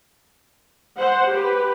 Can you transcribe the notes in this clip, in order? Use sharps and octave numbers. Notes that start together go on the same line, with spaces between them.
C5 F#5
G4 B4